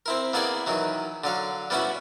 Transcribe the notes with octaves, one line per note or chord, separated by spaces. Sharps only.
C4 E4 A#4
A#3 B3 E4 G#4 D5 G#5
D#3 E3 F#3
D3 F#3 F5
G3 B3 C#4 E4 F#4